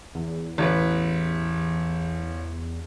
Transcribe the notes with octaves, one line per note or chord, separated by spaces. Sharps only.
E2
A1 B4